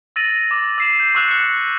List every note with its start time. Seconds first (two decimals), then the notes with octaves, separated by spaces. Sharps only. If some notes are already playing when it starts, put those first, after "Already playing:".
0.16 E6 A6 A#6 D#7 F#7
0.51 D6
0.78 E6 C7 E7
1.00 G6
1.15 C#6 D6 E6 F#6 E7 F7
1.28 F#6 C#7